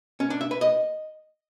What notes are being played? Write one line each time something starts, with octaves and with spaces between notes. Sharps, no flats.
C#4
D4
E5
B4
D#5